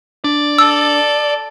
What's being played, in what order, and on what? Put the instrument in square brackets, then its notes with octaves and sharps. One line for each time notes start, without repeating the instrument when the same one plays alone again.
[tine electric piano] D4 [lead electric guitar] D5
[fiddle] A4 [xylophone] E6